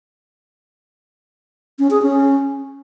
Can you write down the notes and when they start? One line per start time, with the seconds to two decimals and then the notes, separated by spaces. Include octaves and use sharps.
1.79 C#4
1.91 G#4
2.02 C#4